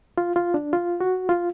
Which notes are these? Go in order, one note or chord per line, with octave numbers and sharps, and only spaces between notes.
F4
F4
D4
F4
F#4
F4